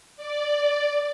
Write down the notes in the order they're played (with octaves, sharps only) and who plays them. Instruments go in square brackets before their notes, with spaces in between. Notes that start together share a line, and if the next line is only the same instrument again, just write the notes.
[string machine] D5